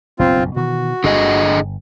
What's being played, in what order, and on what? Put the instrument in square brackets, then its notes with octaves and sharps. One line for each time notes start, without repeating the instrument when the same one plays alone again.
[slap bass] F#1 B1 G2 [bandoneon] C4 F4
[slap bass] B2 D#3 E3 [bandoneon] F#4
[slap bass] G1 [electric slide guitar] D3 G#4 D#5